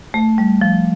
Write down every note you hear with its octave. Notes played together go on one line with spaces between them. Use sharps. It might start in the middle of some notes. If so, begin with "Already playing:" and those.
A3
G3
F3